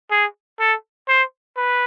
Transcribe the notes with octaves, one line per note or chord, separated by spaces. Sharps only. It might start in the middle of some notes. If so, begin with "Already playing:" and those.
G#4
A4
C5
B4